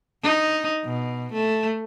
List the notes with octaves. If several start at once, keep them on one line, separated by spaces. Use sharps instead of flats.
D#4
B2
A3